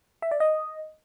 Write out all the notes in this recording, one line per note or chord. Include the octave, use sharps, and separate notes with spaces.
E5
D5
D#5